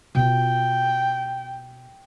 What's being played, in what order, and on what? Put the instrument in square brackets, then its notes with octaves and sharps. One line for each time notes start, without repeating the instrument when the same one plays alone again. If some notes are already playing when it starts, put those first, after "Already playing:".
[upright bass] B2 F4 [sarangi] G5